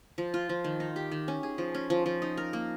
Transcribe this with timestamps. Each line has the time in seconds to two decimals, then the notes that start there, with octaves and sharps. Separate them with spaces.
0.18 F3
0.34 F4
0.49 F3
0.64 D#3
0.80 D#4
0.96 G4
1.11 D#3
1.28 C#4
1.43 G#4
1.58 F3
1.74 C#4
1.90 F3
2.06 F3
2.22 D#4
2.37 A#4
2.53 A#3